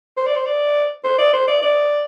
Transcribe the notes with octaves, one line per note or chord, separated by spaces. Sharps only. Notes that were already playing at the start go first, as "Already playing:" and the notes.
C5
D5
C5
D5
C5
D5
C5
D5
D5